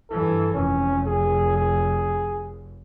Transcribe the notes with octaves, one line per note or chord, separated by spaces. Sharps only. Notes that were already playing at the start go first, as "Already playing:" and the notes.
G2 E3 A4
F1 C#4
G#4
G#4